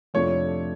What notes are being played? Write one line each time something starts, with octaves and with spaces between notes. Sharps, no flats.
F2 C3 F3 A3 D4 C#5